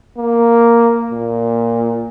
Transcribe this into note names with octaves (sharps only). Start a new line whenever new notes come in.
A#3
A#2